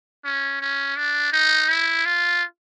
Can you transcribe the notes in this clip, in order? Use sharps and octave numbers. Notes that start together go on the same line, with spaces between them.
C#4
C#4
D4
D#4
E4
F4